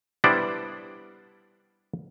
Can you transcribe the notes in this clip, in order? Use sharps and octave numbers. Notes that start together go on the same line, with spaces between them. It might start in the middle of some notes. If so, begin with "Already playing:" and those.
G3 B3 D4 E4 C5 D5